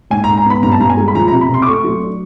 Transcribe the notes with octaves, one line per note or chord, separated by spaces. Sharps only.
G#2 G#5
A#5
G#2
A#5
B3 B5
G2 A#5
A5
G2 A#5
G#5
G#3
B5
F3 A#5
A#5
C3
B5
C3 C6
D6
A3 C#6
F#3
D4